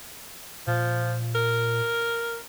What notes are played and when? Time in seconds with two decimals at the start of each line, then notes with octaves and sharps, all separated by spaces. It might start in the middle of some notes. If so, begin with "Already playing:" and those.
0.67 A#2 F3
1.35 A#4